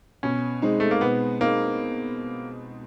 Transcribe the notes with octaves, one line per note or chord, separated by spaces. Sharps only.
B2 C#4
G#3 C4 D#4
A3
A#3
B2 B3
G#3 A#3 C4 D#4